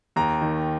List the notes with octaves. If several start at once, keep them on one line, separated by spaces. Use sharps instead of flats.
D#2 A#5
D#3